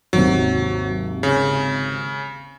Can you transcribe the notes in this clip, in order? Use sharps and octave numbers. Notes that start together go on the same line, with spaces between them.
G#1 D#2 C3 F#3
C#3